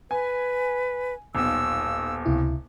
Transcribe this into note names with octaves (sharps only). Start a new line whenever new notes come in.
B4 G#5
D#1 B1 E6
C#2 C3 E4